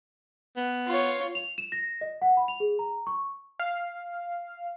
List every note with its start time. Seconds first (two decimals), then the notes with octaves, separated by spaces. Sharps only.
0.57 B3
0.87 F4 C#5
1.35 F7
1.58 E7
1.72 A#6
2.01 D#5
2.22 F#5
2.37 B5
2.48 F7
2.60 G#4
2.79 A#5
3.07 C#6
3.60 F5